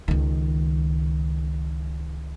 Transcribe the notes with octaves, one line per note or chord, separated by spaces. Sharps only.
C#2 D#3